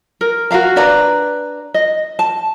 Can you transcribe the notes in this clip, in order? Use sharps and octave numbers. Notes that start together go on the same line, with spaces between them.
A#4
F#4 A#4 F5 A#5
D4 B4 D5 A#5
D#5
A5